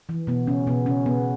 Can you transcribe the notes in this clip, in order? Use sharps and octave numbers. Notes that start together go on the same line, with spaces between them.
E3
B2 B3
C#3 C#4
B2 B3
C#3 C#4
B2 B3